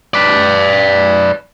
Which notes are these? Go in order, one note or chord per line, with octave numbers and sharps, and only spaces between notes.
B4 D5